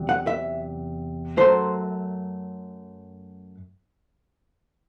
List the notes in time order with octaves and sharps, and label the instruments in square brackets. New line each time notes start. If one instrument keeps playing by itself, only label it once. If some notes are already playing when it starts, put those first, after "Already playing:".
Already playing: [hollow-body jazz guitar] E2 C3 F#3
F#5
E5
F#2 F#3 A3 C5